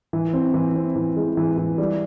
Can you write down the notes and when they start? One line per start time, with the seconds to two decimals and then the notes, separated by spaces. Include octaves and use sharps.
0.13 E3
0.33 C4
0.54 E3
0.76 C4
0.96 E3
1.17 G#3
1.37 E3
1.58 E3
1.78 G3